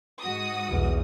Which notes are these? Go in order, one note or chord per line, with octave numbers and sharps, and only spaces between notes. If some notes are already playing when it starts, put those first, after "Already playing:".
G#2 F#4 D#6
B1 E2